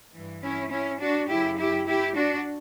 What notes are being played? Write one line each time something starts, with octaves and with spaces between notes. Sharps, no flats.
G2 E3
C#4 E4
C#4 E4
D4 F#4
F#2 C#3 F#3 E4 G4
E4 G4
E4 G4
D4 F#4